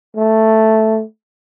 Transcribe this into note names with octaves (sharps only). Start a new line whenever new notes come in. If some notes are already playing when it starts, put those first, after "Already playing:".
A3